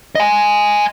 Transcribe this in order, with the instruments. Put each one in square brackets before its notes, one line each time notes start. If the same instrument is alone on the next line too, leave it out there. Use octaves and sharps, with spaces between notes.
[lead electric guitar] D#5 G#5